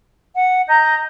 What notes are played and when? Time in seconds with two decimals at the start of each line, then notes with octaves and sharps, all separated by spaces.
0.35 F#5
0.68 D#5 A#5 G6